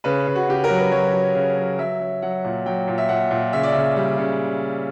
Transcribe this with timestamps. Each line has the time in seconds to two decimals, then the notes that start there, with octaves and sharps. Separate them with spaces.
0.04 C#3 B4
0.27 C#3
0.35 F#4
0.48 C#3 G4
0.64 A#4
0.70 F#3
0.78 B4
0.91 F#3 C#5
1.13 F#3
1.35 C#3
1.57 F#3
1.79 F#3 E5
2.00 F#3
2.22 F#3 F#5
2.44 A#2
2.66 F#3 G5
2.88 A#2
2.98 E5
3.09 A#2 F#5
3.31 A#2
3.53 C#3 E5
3.63 D5
3.73 C#3 E5
3.96 G3
4.18 C#3